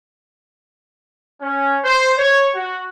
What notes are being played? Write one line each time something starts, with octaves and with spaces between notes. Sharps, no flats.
C#4
C5
C#5
F#4